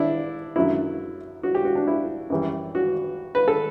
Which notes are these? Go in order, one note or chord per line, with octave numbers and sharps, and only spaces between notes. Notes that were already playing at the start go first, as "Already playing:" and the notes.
Already playing: D4 E4
F#2 D3 F#3 E4
F#4
G4
F#4
D4
E4
F#2 E3 G3
F#4
B4
A4